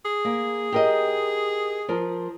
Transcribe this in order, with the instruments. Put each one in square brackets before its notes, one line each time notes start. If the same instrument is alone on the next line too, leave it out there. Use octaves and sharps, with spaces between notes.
[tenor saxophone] G#4
[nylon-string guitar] A#3
G4 A#4 D#5
F3 A#4